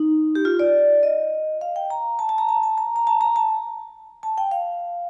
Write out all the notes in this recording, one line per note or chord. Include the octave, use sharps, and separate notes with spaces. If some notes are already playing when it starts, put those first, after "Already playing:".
Already playing: D#4
G4
F4
D5
D#5
F5
G5
A#5
A5
A5
A#5
A5
A5
A#5
A#5
A5
A#5
A5
A5
G5
F5